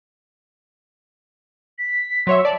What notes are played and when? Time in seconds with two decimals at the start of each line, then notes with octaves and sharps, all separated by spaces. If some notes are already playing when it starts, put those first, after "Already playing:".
1.78 B6
2.27 F#3 C#5 E5 C6
2.45 D5 A5